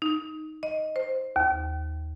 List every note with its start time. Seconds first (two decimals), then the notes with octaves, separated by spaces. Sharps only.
0.02 D#4
0.63 D#5
0.96 C5
1.36 D#2